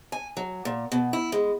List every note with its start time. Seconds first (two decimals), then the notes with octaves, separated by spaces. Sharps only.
0.12 G#5
0.37 F#3
0.65 A#2
0.92 B2
1.13 E4
1.32 G#3